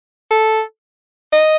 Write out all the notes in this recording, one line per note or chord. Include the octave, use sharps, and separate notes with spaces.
A4
D#5